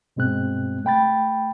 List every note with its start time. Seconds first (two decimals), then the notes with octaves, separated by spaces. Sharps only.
0.16 G2 B2 G#3 C4 F#6
0.85 A3 G5 B5 A6